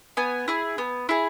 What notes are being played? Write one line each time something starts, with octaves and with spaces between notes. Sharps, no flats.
B3 G#5
E4 G#4
B3
E4 G#4